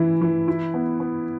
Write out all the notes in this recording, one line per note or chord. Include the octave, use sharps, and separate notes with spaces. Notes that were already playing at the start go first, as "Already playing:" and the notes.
Already playing: E3 E4
E3
E4
B3
B3